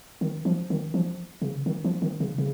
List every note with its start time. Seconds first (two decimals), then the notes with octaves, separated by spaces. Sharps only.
0.21 D#3
0.45 F3
0.70 D#3
0.94 F3
1.42 C#3
1.66 D#3
1.84 F3
2.02 D#3
2.20 C#3
2.38 C#3